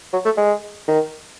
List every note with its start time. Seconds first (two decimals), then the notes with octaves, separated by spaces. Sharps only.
0.13 F#3
0.25 A3
0.37 G#3
0.88 D#3